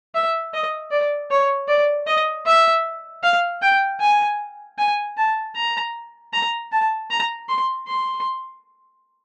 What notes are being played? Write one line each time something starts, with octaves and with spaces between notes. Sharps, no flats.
E5
D#5
D5
C#5
D5
D#5
E5
F5
G5
G#5
G#5
A5
A#5
A#5
A5
A#5
C6
C6